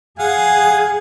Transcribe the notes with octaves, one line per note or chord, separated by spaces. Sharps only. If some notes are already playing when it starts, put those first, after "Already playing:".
G#4 F5 F#5 G#5